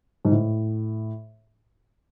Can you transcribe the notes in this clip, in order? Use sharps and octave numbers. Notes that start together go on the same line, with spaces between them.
G#2
A2